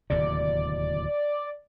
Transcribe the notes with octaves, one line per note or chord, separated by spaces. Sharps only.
D1 D#2 C3 D5